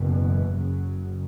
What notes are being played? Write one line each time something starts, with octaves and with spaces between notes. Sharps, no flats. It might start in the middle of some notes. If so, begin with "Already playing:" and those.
Already playing: F#1 E2 B2
E3
F#1 F#2 C#3 F#3